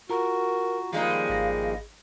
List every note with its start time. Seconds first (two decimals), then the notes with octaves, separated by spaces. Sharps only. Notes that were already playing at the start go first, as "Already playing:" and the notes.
0.10 F4 F#4 A#4 A#5
0.93 D#3 F3 G3 G#3 A#3 D#4 F5
1.29 G#1 A#6